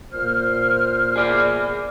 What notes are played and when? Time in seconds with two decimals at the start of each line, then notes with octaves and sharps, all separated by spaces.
0.12 A#2 C5 F6
1.16 G#4 D5